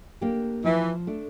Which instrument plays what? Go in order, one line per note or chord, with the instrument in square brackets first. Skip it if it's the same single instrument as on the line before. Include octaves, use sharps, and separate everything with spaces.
[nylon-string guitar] A#3 D4 G4
[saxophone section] E3 [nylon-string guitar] F3
[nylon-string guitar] A3 D4